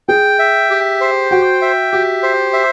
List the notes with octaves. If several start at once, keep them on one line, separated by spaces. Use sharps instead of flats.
G#4 G5
E5
G4
C5
F#4 G5
E5
F#4 G4
C5
E5